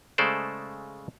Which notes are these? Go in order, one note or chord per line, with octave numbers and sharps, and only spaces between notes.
C#3 G#3 A3 A4 C5 D5